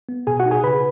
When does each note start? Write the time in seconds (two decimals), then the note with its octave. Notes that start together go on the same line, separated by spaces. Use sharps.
0.09 B3
0.27 B2 G#4 G#5
0.40 F#4 F#5
0.46 D#4
0.51 G#4 G#5
0.64 C#3 B4 B5